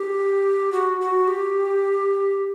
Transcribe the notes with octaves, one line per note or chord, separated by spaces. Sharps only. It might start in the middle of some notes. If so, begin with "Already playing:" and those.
Already playing: G4
F#4
F#4
G4